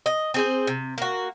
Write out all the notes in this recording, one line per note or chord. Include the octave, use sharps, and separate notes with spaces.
D#5
C4 G#4 C5
C3
A#3 F#4